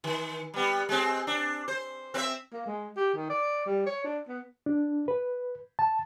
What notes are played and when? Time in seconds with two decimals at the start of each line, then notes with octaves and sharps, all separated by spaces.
0.04 D#3
0.54 G3 B3
0.89 G#3 C4
1.27 D4
1.68 C5
2.14 C4 B4 E5
2.53 A#3
2.66 G#3
2.97 G4
3.14 D#3
3.30 D5
3.66 G3
3.86 C#5
4.04 D4
4.29 B3
4.66 D4
5.08 B4
5.79 A5